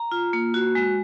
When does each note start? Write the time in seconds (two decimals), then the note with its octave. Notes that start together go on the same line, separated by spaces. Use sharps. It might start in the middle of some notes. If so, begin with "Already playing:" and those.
Already playing: A#5
0.12 F4
0.33 A#3
0.54 F#4
0.75 G#3